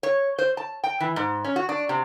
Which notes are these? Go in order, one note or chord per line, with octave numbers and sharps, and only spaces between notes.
C#5
C5
A5
G5
E3
G#2
C#4
F#4
D4
C3